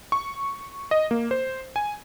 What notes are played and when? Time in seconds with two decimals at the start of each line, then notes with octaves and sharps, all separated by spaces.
0.12 C#6
0.91 D#5
1.11 A#3
1.31 C5
1.76 G#5